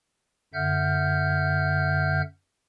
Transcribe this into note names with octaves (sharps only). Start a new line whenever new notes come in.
F#2 D3 E5 F#5 F6 G6